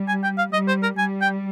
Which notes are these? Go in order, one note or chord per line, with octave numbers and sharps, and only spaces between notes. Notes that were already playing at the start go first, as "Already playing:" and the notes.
Already playing: G3
G#5
G5
F5
G3 D#5
C5
A#4
G3 G#5
G5